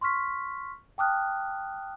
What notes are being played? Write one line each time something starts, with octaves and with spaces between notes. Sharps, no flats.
C6 C#6 F6 B6
G5 A5 D6 D#6 F6 F#6